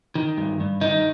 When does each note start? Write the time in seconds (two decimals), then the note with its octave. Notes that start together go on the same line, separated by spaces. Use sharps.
0.15 D#3
0.37 G2
0.60 G2
0.81 D#3 D#4